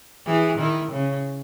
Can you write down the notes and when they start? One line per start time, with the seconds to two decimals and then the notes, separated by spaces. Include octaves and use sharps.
0.27 E3 G#4
0.58 D#3 E4
0.92 C#3 C#4